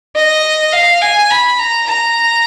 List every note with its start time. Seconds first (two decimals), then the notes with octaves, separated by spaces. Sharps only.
0.16 D#5
0.73 F5
1.02 G#5
1.30 B5
1.59 A#5
1.87 A#5